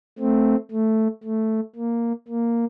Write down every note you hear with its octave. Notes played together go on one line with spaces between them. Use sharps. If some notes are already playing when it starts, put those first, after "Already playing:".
A3 C4
A3
A3
A#3
A#3